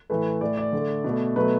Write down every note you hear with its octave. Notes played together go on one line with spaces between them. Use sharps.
A2 E3 A3 B4
A2 A3 D5
D5
D3 A3
B2 A3
B2 F#3 A3 B4